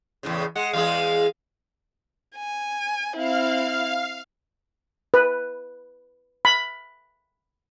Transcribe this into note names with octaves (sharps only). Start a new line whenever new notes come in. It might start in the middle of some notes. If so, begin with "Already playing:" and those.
E2 A2 C#3
G#3 F#5
E2 G#3 G#4 F5
G#5
C4 E4 F5
B4
B5